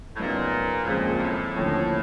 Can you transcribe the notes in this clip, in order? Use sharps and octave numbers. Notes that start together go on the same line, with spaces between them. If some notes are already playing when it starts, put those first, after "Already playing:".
A2
F#2 A#2 C#3 F#3 B3 D#4
A2
D#2 A#2 C#3 F3 G#3 C4
A#2
A2
D#2 D3 F3 A3 C#4